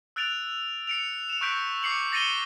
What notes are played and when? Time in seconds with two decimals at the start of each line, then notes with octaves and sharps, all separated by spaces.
0.16 E6 F#6 A6 D7 F7
0.87 C#7 D7 F7
1.30 E7 F7
1.41 C#6 E6 F#6 G6 B6 D7
1.83 D6 C7 C#7 F#7
2.12 A6 A#6 C#7 D#7 E7 G7